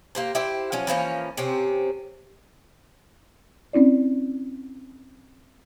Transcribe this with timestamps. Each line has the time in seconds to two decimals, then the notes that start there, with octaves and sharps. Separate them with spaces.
0.15 A#3 G4 C5
0.35 E4 G4 C5
0.72 F3 F#3 C#4
0.87 E3 F3 A#3 C#4
1.37 C3 C4 C#4
3.73 C4 C#4 E4 D5